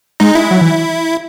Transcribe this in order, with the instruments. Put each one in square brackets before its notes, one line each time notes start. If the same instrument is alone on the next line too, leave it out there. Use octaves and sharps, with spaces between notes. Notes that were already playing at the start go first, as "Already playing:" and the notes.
[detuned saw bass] G#3 [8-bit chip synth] D#4
[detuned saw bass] G#3 [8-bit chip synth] E4
[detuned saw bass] F#3
E3